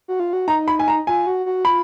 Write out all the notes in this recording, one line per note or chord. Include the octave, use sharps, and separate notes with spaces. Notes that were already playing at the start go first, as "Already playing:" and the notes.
F#4
F4
F#4
D#4 A#5
B5
G#5
A#5
F4 G#5
F#4
F#4
F4 B5